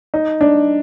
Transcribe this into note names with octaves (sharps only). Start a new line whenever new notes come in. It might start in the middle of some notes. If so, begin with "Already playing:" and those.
D#4
D4